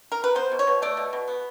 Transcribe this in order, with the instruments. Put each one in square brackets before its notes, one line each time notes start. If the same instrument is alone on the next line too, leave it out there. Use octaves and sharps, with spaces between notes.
[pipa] A#4
B4
B3 C5
B2
C#5
B2
A3 D5
B2
B2
B3